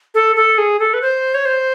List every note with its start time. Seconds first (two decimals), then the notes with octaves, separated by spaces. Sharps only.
0.14 A4
0.35 A4
0.57 G#4
0.79 A4
0.93 B4
1.01 C5
1.34 C#5
1.45 C5